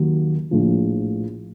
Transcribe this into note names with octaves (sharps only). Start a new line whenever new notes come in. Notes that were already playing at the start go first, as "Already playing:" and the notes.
Already playing: D#2 D#3 F#3
A#1 A2 F3